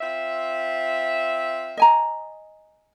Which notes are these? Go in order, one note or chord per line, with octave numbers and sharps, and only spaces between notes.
C4 F4 E5
D#5 G#5 A#5